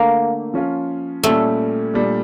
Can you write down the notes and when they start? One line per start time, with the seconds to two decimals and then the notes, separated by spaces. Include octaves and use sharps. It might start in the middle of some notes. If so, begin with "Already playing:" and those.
Already playing: D3 A3 A#3 D4
0.54 F3 C#4 F4
1.23 A#2 G3 A3 C#4 G4
1.94 A#2 G3 D4